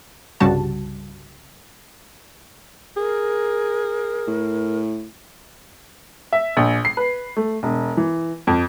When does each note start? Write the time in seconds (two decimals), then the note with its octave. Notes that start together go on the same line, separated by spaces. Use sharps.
0.40 C2 G2 C#3 G3 F#4 A5
2.97 G#4 A#4
4.28 A2
6.33 E5
6.57 A#1
6.85 C7
6.97 B4
7.37 A3
7.63 E1
7.97 E3
8.47 F2